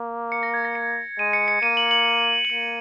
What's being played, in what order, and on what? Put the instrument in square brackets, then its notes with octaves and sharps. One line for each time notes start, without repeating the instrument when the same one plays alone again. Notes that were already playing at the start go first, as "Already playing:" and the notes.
Already playing: [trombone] A#3
[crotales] C#7
A#6
G#6
A#6
C#7
[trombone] G#3 [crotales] D#7
[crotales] C#7
C#7
[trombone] A#3 [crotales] D#7
[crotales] F#7
F#7
F#7
[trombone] A#3 [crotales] D#7